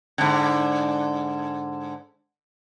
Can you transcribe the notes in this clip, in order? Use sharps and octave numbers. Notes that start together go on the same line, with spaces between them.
G#2 D3